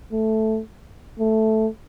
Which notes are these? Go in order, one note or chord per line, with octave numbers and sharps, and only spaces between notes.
A3
A3